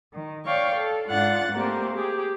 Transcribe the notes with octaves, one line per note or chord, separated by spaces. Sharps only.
D#3
C#5 D5 F5 G5 C#6
A4
G#2 D4 F4 F#5 F#6 A6
A3 A#3 C4 G4 A#4 C5
G4 G#4